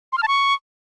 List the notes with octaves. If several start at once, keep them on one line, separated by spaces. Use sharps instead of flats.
C6
F6
A5
C#6